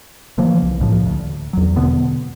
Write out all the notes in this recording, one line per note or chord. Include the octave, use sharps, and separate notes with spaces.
C#3 E3 F3 A#3
C2
C#2 A2 C#3 F3
D2
E2 F#3
B2 D3 B3